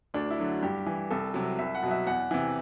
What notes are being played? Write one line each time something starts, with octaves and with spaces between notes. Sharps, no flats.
D2 D4
E4
D3 F#3
G2 G4
E3
C2 A4
C3 F#3
C2 E5
F#5
B2 F#3
E5
E2 F#5
C3 E3